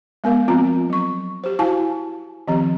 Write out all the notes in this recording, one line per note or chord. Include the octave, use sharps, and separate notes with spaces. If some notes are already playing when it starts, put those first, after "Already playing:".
G#3 B3 A#4 F5
F3 B3 C4 F4 A#5
F#3 C#6
G4 C5
E4 F#4 F5 G#5 A5
D#3 F3 C4 G4 A#5